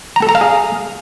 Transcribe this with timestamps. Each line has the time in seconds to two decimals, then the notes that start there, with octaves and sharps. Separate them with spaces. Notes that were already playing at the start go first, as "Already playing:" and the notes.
0.16 A#5
0.22 A4
0.29 A#5
0.35 F5
0.41 G#4